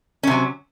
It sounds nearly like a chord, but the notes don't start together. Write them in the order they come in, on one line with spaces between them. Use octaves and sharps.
C#4 C3 F#3